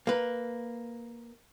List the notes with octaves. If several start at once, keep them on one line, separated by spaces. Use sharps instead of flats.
A#3 B4